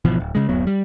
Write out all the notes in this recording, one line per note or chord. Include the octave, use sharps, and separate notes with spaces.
G#1 B2 E3 F3
D1
C#3 G#3
D1 F#2 F#3 B3
G3